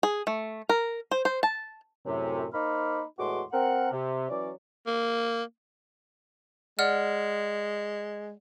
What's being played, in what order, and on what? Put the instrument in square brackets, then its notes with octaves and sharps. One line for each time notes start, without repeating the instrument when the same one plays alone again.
[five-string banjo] G#4
A3
A#4
C5
C5
A5
[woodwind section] F#2 A2 C3
A#3 D#4 C5 B5 D6 F6
E2 A2 G#3 F#4 C6 D6
C4 A#4 F#5
C3
E3 F#3 C#4 D5
[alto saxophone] A#3
[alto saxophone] G#3 [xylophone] D5 F#5 F6